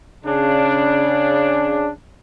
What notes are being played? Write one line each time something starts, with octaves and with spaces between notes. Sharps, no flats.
C#3 D4